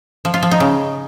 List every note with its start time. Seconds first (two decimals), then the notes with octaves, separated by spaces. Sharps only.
0.25 F3
0.34 F4
0.43 F3
0.51 D#4
0.60 C#3